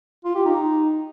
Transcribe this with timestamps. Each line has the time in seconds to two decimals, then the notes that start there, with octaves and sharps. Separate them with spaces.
0.25 F4
0.35 G4
0.45 D#4